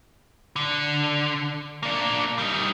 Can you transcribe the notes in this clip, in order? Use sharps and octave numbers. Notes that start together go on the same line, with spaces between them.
D3
A#3 D4
G3 D#4